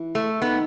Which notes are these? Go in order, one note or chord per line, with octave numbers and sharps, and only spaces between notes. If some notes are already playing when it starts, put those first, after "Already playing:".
Already playing: E3
A3
D#3 B3